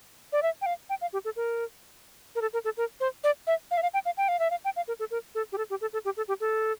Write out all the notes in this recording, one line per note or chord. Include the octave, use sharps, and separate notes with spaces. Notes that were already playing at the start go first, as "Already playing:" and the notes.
D5
E5
G5
F5
G5
F5
G4
A4
A#4
A#4
A4
A#4
A4
A#4
C5
D5
E5
F5
E5
F5
G5
F5
G5
F5
E5
F5
G5
F5
A#4
A4
A#4
A4
G4
A4
G4
A4
A4
G4
A4
G4
A4